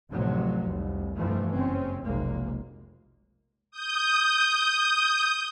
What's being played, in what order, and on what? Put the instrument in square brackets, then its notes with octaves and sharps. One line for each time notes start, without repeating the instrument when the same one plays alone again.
[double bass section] A1 D2 A2 C3 F3 F#3
F1 C2
G2 B2 E3 F3 A3
F#1 C4 C#4
F1 B1 G#3 A#3
[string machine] D#6 G6